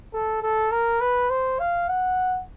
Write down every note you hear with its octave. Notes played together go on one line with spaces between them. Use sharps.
A4
A4
A#4
B4
C5
F5
F#5